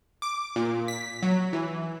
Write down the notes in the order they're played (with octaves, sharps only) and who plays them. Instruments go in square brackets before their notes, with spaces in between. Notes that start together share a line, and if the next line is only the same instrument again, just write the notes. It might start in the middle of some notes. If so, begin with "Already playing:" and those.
[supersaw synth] D6
A#2
B6
F#3
E3